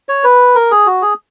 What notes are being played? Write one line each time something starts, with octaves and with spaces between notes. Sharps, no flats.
C#5
B4
A#4
G#4
F#4
G#4